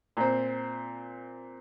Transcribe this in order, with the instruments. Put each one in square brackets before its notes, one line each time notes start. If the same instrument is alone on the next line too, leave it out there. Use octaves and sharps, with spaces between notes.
[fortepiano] A#2 C4